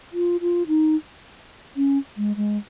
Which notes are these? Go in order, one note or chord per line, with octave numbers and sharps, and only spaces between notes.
F4
F4
D#4
C#4
G#3
G#3